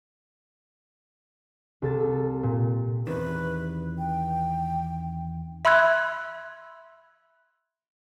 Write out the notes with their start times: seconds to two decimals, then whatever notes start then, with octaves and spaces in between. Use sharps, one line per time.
1.82 C2 A4 A6
2.00 A4
2.43 A#2
3.07 E2 C3 D#3 B4
3.98 G5
5.65 E5 B5 C6 E6 F#6 G#6